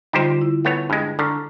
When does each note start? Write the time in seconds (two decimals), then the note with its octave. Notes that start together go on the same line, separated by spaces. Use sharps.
0.13 D3 G3 D#4 F4 G4 C5
0.41 E4
0.65 A3 B3 C#5
0.90 G2 G#3
1.19 D3 A#5 C#6 F6